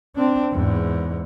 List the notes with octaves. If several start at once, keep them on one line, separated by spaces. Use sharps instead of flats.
C4 D4
E2 G#2